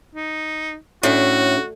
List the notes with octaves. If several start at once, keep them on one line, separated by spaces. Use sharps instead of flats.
D#4
A2 C#4 D4 E4 F#4